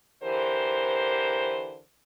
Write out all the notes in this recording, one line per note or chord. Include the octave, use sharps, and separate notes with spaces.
D3 E3 G4 A#4 C5